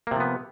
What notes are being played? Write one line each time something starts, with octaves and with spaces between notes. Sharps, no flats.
C3 F3 A#3 B3